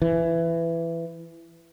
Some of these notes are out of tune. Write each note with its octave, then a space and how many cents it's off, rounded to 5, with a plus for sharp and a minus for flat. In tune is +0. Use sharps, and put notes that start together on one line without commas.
E3 +15